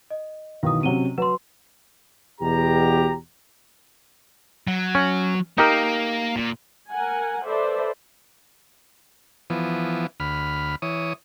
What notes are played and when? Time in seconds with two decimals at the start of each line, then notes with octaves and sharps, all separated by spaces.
0.10 D#5
0.63 B1 D#3 E3 F5 D#6
0.83 C3 F#3 C#4 D#7 G7
1.18 F#3 B4 C6
2.41 E2 B2 G4 A#5
4.67 F#3
4.95 C#4
5.58 A#3 D#4 G4 A#4
6.36 A#2
6.90 A#4 F#5 G#5
7.46 A4 B4 C5 D5 E5
9.50 E3 F3 B3
10.20 D2 B5 F6
10.82 E3 C#5 D#6